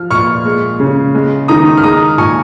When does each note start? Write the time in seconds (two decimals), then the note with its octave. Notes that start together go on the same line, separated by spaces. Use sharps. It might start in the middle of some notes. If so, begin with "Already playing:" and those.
Already playing: F3 F6
0.11 A#2 C#6 F6
0.45 G#3
0.80 C#3
1.15 G#3
1.48 D#3 A#5 D#6
1.78 F6
1.84 G#3 A#5 D#6
2.18 A#2 G#5 C#6